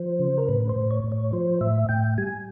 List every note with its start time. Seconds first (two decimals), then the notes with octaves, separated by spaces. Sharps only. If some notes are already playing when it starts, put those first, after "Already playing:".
Already playing: F3 C5
0.19 C#3
0.38 A#4
0.48 A2 B4
0.69 C5
0.76 A2
0.91 C#5
1.04 A2
1.12 C#5
1.33 F3 C5
1.61 A2 E5
1.89 A2 G5
2.18 G3 G#5